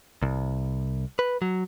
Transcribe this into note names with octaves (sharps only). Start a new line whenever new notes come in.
C2
B4
F#3